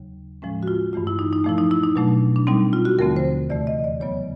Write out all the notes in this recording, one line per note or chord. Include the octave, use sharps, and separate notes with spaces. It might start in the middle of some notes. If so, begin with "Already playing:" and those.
Already playing: D#2 C#3 F#3
A2 F3 G#3 C#4
F#4
F4
G2 E3 A3 F4
E4
D#4
D#4
A#2 F3 A3 E4
D#4
E4
D#4
B2 F#3 A3 D4
D4
A#2 G3 C4 D#4
F4
F#4
D#2 D3 F3 A3 C4 A#4
C5
E2 C3 E3 A3 D5
D#5
D5
E2 C#3 F#3 B3 C#5